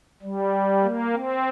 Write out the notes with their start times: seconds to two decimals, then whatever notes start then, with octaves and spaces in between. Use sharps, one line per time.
0.22 G3
0.83 A#3
1.14 C4